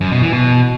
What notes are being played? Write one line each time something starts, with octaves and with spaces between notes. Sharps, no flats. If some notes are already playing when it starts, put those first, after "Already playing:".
F#2
B2
E3
B2